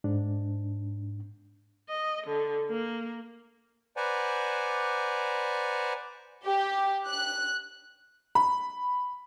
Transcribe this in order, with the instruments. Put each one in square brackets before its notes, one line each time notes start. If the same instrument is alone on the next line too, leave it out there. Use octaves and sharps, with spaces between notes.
[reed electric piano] G#2 D4
[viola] D#5
D3
A#3
[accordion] B4 C5 D5 F#5 G#5 A#5
[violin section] G4
F#6
[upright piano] B5